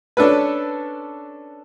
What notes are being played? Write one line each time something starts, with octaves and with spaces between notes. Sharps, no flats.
C#4 D4 A4 B4